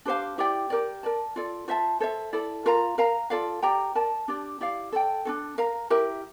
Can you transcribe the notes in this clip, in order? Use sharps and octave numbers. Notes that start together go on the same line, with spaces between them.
D4 G4 C5 F5
E4 G4 D5 G5
G4 A#4 D5
A#4 D5 A5
F4 A4 D5
F4 C5 E5 A5
A4 C5 E5
E4 A4 D5
F4 A#4 F5 A#5
A#4 F5 A#5
F4 A4 D5 F5
G4 D5 G5 A#5
A#4 D5 A5
D4 G4 D5
E4 G4 D5 F5
A4 D5 G5
D4 F4 A4
A#4 F5 A#5
E4 G4 A#4 E5